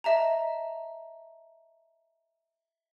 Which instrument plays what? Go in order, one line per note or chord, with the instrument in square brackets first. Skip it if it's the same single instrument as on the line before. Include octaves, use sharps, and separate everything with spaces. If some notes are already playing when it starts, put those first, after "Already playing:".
[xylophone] D#5 E5 A5 A#5